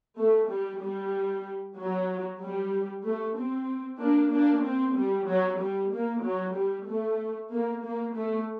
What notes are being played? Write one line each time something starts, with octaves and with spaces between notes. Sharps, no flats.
A3
G3
G3
F#3
G3
A3
C4
A#3 D4
A#3 D4
C4
G3
F#3
G3
A#3
F#3
G3
A3
A#3
A#3
A3